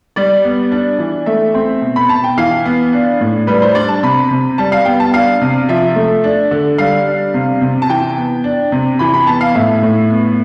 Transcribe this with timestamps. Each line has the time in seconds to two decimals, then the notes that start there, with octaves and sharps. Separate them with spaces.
0.16 G3 D5
0.44 B3
0.72 D4
0.99 E3
1.26 A3 E5
1.55 C4
1.82 B2
1.96 B5
2.09 B2 A5
2.24 G5
2.38 E3 F5
2.65 B3
2.93 D4
3.21 A2
3.47 G3 B4
3.62 C5
3.75 D4 D5
3.89 A5
4.03 C3 B5
4.31 C3
4.58 G3 A5
4.72 F5
4.85 B3 G5
5.00 A5
5.14 D4 F5
5.41 C3
5.69 F3 E5
5.96 A3
6.24 D4
6.51 D3
6.78 G3 F5
7.07 D4
7.34 C3
7.61 C3
7.82 A5
7.89 E3 G5
8.18 B3
8.44 D4
8.72 C3
8.99 E3 B5
9.14 B5
9.27 B3 A5
9.41 F5
9.55 A2 E5
9.83 A2
10.10 B3